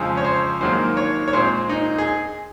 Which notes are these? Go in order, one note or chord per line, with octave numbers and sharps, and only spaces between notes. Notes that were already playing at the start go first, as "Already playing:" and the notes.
Already playing: F2 C#3 F3 G#3 C5
C#5
C5
G#2 D#3 F#3 A#3 C5
C#5
C#5
A#2 G#3 C4 C5
D#4
G#4